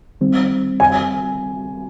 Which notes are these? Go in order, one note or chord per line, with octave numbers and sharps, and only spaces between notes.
D#3 G3 C4
G#5